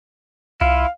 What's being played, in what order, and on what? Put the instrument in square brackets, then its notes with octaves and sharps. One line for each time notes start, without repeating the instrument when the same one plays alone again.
[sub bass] C2 [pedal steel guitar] E4 F4 [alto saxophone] F5